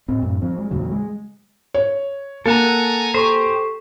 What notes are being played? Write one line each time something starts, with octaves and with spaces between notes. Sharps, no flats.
A2 C4
F#2 A2
F3 C4
G#3
E2 A#2 C#3 F#3
G#3
C#5
A#3 A4 F#5 G#5 A#5
G4 A4 C5 C#6